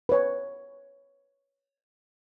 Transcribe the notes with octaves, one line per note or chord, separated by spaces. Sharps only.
B4 C#5